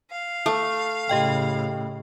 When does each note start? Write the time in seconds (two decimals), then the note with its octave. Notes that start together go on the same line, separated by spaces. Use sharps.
0.11 F5
0.46 A3
1.09 A2 C#3 G4 D#5 G5